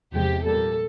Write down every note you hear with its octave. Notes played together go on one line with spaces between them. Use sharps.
E2 C3 F3 G#3 G4
A#2 G3 A#3 A4